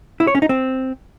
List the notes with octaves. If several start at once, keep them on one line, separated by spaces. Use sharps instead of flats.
E4
C#5
C#4
D#4
C4